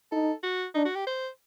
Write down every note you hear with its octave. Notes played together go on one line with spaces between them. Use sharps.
D#4 A4
F#4
D4 D#4
F#4
G4
C5